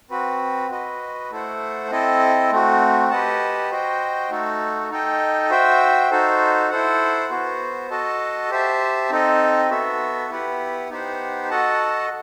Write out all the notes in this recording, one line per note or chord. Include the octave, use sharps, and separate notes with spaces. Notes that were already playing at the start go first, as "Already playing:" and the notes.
C4 F#4 B4
F#4 B4 D#5
A3 E4 A4 C5 F#5
C4 E4 A4 D#5
A3 C4 F#4
G4 B4 D#5 F#5 A5
F#4 C5 D#5 G5
A3 D#4 F#4 A4
D#4 A4 D#5 G5
F#4 C5 E5 G5
D#4 F#4 A4 C5
E4 A4 C5 F#5
B3 F#4 C5
F#4 A4 D#5 A5
G4 C5 E5 A5
C4 D#4 A4 D#5
B3 F#4 A4 E5
B3 E4 G4 B4 F#5
B3 D#4 G4 C5 F#5
F#4 A4 D#5 F#5 A5